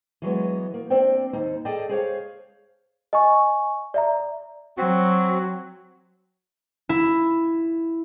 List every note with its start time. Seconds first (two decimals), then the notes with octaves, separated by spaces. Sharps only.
0.22 E3 F#3 G#3 B3
0.74 A#3
0.90 C4 D4 G5
1.33 D#2 D#4 C5
1.65 G#4 A4 D5 D#5 G5 A5
1.89 G#4 C5 C#5 F5
3.13 D#5 G#5 C#6
3.94 D5 E5 A#5
4.78 F#3 C4 F#4
6.89 E4